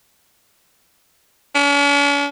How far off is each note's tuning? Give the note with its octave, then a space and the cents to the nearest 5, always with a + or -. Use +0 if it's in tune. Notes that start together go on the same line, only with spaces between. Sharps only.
C#4 +45